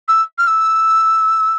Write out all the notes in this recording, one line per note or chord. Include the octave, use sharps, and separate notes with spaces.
E6
F6
E6